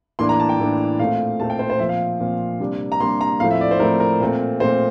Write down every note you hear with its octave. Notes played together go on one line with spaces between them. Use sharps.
A2 E3 A#3 D4 C6
A#5
A5
G5
A2 E3 A#3 D4
A#2 A3 C4 F5
A#2 A3 C4 A5
G5
C5
C5
A#2 F3 C4 E5
F5
A#2 F3 C4
C3 G3 A#3 D4
A#5
C3 G3 A#3 D4 C6
A#5
A2 F3 A3 C4 F5
E5
D5
C5
A2 F3 A3 C4 A#4
A#4
A#2 A3 C4
A#2 A3 C4 C5